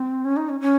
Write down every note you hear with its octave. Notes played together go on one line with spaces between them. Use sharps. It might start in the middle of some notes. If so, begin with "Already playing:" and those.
Already playing: C4
C#4
D#4
C#4
C#4